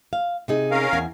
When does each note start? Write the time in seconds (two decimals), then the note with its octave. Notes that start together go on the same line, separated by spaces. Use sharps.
0.13 F5
0.48 C3 D#4 G#4
0.71 C#4 A#4 F5
0.93 E2 G#5